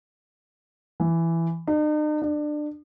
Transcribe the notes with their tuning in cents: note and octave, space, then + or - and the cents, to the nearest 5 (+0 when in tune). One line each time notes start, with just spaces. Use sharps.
E3 +10
D#4 -45
D4 +25